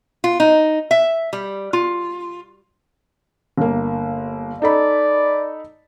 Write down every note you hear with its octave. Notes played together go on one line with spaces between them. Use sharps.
F4
D#4
E5
G3
F4
G1 A#3
D#4 A4 D5 B5